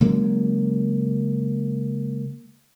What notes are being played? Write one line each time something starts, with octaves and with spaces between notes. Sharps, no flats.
C#3 F#3 G#3 A#3